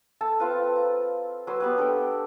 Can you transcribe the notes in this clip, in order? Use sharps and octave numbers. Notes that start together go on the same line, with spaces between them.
A4 A5
C4 F4 B4
A#5
F#3 B4 C6 E6
B3 G4 B4
D4 A4 A#4 G5